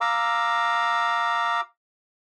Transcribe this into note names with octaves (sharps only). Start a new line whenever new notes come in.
F5 A#5 D6 E6